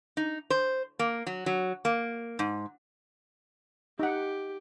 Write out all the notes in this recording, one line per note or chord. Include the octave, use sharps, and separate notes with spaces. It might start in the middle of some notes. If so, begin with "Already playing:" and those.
D#4
C5
A#3
F#3
F#3
A#3
G#2
D#4 G4 F#5